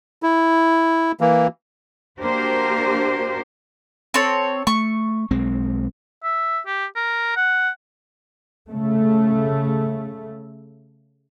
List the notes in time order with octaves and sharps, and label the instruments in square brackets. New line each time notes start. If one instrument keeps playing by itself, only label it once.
[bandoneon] E4
E3 A#3
[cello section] A#3 D4 F#4 G4 A#4 C5
[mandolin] C4 A4 C#5
[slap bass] A3 [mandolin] C#6
[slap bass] B1 G#3 C4
[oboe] E5
G4
A#4
F#5
[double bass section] C#3 A3